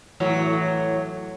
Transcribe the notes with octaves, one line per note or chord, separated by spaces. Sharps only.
A2 E3 F#3